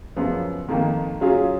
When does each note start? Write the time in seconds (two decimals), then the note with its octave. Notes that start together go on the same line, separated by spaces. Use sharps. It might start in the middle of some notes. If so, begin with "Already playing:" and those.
0.16 F#2 C#3 F3 B3
0.68 F2 D#3 A#3
1.21 C#3 F#3 C#4 F4 G#4